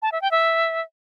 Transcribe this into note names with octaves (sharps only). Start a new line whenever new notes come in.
A5
E5
G5
E5